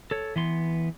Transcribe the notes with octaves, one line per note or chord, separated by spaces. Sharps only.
A4 C#5
E3 B3 C6